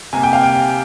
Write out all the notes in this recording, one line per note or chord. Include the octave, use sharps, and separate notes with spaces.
C3 G3 A#3 G#5
G5
F5
G5